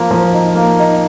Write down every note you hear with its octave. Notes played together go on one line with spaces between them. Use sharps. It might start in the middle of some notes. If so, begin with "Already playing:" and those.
Already playing: F3 A#3
F3
D#4
A#3
D#4